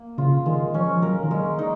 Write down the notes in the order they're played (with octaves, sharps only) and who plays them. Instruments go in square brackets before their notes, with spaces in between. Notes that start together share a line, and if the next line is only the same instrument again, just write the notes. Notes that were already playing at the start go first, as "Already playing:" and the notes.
Already playing: [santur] A#3
[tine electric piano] C#3 [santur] F4
[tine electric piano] D#3 [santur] G#3
[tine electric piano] F3 [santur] C#4
[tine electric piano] F#3 [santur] A#4
[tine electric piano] D#3
[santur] G#3
D#4